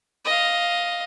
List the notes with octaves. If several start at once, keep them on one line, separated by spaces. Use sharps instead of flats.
D#5 F5